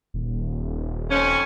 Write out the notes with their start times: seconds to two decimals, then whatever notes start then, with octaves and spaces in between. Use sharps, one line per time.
0.14 D#1
1.10 F2 C#4